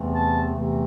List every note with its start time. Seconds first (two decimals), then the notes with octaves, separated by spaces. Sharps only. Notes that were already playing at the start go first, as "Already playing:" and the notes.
Already playing: E2 C3 E3 A3 C4
0.13 A5
0.54 E2 C3 E3 A3 C4